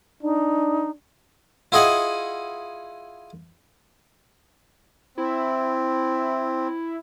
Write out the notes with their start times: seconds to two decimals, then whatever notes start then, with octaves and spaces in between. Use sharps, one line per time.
0.22 D4 D#4
1.72 E4 F4 G#4 D#5 F#5
5.18 C4 E4